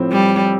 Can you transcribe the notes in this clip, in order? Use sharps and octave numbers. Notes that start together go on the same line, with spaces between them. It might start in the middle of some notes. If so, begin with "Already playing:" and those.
Already playing: A2 F3 C4
G3